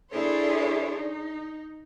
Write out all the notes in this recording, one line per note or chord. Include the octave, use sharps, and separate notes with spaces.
D4 E4 G#4 A4 C5 C#5
D#4